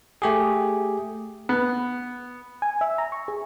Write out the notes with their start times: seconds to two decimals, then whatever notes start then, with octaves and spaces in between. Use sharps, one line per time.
0.22 A3 G4 G#4
1.49 B3
2.62 G#5
2.81 E5
2.98 A#5
3.12 C#6
3.28 G#4